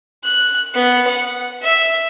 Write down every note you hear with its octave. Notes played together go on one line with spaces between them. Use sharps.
F#6
B3
F#5
E5